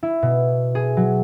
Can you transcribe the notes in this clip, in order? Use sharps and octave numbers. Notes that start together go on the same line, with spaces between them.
E4
B2
G#4
F#3